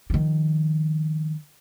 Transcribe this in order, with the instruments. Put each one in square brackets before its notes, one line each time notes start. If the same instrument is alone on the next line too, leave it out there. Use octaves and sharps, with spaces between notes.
[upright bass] D#3 F3